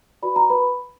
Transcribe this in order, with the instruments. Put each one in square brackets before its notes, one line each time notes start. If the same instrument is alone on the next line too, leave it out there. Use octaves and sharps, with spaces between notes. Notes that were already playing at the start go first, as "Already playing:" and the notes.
[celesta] F#4 B4 D5 B5
A#5
B4 B5